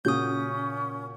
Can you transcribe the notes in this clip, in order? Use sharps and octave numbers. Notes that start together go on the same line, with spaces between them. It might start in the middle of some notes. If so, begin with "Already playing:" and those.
A#2 C#3 C#4 F#4 D#6 G6